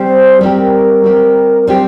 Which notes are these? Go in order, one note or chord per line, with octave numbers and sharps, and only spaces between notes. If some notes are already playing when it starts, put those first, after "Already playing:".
Already playing: G3 C4 G4 C5
G3 C4 G4 A#4
G3 C4 G4
A#4
G3 C4 G4 C5